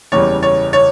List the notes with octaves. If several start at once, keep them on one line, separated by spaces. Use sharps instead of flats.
F#1 E2 C#3 G3 C#5
C#5
C#5